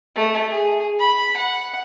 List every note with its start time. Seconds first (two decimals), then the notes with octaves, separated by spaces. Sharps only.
0.16 A3
0.50 G#4
0.99 B5
1.36 F#5